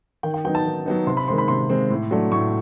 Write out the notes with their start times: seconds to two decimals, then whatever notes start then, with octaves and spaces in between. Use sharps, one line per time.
0.23 D#3 G5
0.34 G5
0.45 F#3 B3 D#4 G5
0.55 A5
0.65 D#3
0.86 F#3 B3 D#4
1.07 C3 C6
1.17 B5
1.28 D#3 G#3 C4 C6
1.38 B5
1.48 C3 C6
1.70 D#3 G#3 C4
1.90 A2
2.11 F#3 A3 D4
2.32 A2 C#6